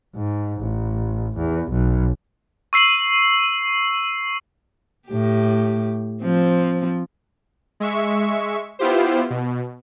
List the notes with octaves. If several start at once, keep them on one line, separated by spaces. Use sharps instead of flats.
G#2
A1
E2
B1
C#6 E6 C7 D#7 F#7
A2 G4
F3 C4
G#3 E5 C#6
B3 E4 F4 G4 C5
B2